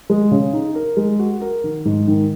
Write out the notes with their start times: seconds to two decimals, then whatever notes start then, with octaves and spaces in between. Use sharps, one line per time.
0.10 G#3
0.31 C#3
0.53 D#4
0.75 A#4
0.97 G#3
1.19 F#4
1.41 A#4
1.64 D#3
1.85 G#2
2.08 D#3